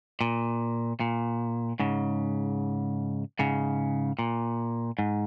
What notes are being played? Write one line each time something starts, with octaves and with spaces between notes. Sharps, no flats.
A#2
A#2
G#2 C#3
G#2 C#3
A#2
G#2